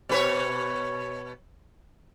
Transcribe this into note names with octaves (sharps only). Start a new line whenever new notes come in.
B2 B4 C#5